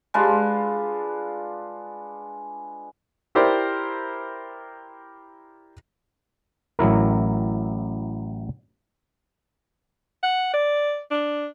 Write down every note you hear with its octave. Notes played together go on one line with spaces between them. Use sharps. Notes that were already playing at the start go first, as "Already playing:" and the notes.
G#3 D4 F4 B4
E4 G4 A#4 C5 D5
A1 F#3 E4 A#4
F#5
D5
D4